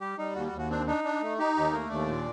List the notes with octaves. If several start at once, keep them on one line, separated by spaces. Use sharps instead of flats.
G3 G4
G3 D#4
D#2 F#4
F#4
D#2
F#4
C4 D4
D4 D#4
D4
A3
D#4 G4
D#2 G4
A3 A#3 A#4
D#2 D4 D5
A#2